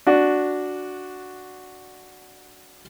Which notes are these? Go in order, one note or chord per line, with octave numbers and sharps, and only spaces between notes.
D4 F#4